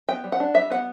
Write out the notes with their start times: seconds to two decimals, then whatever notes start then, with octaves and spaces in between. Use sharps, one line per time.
0.09 B3 G5
0.24 G3
0.32 F#5
0.40 D4
0.54 G3 E5
0.70 B3 F#5